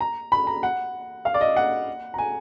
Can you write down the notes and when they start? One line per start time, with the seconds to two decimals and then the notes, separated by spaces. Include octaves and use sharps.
0.01 A#5
0.32 B5
0.47 A#5
0.63 F#5
1.25 F5
1.34 D5
1.41 D#5
1.56 F#5
2.14 A#5
2.18 G#5